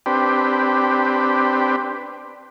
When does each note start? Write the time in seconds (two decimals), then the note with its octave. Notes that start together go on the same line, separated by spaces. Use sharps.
0.06 C4 D4 G4 B4